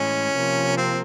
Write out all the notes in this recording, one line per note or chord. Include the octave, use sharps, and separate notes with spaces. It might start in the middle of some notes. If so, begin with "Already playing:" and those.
Already playing: A2 E3 G#3 C#4
C3 F3 A#3
C4